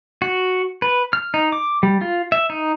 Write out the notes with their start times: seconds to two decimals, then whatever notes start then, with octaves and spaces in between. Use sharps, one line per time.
0.22 F#4
0.82 B4
1.13 F6
1.34 D#4
1.52 D6
1.83 G3
2.01 F4
2.32 E5
2.50 D#4